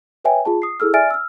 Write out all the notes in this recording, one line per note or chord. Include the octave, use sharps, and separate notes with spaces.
B4 C#5 E5 G5 G#5
F4 G#4 A5
D#6 C7
E4 G#4 A4 E6 F6
D5 E5 G#5 F6 A6 D7
E6 F6